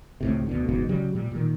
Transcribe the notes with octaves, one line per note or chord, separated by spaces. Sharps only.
C#2 A2 C3
D2 B2 D3
F#1 E2 G#2 B2
C#3 F#3 G3
A#2 G3
A#2 D#3